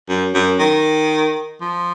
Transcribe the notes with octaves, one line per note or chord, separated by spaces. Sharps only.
F#2
F#2
D#3
F3